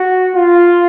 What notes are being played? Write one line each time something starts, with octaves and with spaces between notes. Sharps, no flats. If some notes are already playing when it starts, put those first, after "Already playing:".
Already playing: F#4
F4